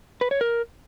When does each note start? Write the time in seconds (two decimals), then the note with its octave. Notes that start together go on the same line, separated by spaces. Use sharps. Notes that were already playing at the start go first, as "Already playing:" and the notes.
0.21 B4
0.31 C#5
0.41 A#4